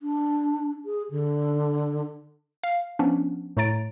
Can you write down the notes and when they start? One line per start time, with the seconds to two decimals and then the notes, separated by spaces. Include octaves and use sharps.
0.02 D4
0.85 G#4
1.10 D3
2.64 F5
2.99 F3 B3 C#4 D4
3.57 A2 A3 C#5 A#5 A6 D7